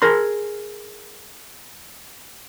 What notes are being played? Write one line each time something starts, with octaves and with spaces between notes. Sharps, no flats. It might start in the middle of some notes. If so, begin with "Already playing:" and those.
G#4 A#4 C6